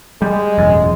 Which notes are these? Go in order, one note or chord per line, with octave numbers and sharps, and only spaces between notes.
G3 G#3
E1 A1 F#2